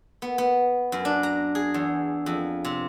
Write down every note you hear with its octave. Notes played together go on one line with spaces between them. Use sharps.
B3
B3
F#2
D4
A#5
G#4
E2
F2
C3